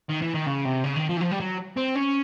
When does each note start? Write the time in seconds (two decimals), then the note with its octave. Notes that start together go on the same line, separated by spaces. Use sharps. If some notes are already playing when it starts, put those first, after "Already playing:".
0.09 D#3
0.22 E3
0.34 D#3
0.47 C#3
0.65 C3
0.84 C#3
0.96 D#3
1.09 F3
1.17 E3
1.21 F3
1.31 G3
1.40 F#3
1.77 C4
1.95 C#4